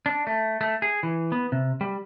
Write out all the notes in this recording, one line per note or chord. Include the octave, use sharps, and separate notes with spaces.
D4
A3
A3
G#4
E3
B3
C3
G3